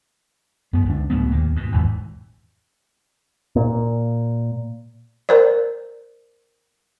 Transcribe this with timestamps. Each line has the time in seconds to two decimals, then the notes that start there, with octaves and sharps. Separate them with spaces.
0.73 F#2 B3
0.86 C#2 D3 D4
1.10 C#2 A2 F#3 B3
1.33 D#2 A#3
1.56 G#2 B2
1.72 G#1 E2 G#2 E3
3.56 A#2
5.29 A#4 C5 D5